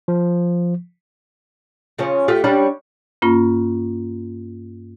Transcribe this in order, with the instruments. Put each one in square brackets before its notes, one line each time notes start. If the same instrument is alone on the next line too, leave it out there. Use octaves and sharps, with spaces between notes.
[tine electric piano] F3
[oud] C#3 F3 C#4
A3 F4 G4
G3 C#4 D4
[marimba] G2 A#3 C#4 F4